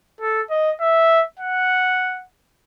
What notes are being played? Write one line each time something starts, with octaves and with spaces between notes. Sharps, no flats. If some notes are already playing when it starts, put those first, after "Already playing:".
A4
D#5
E5
F#5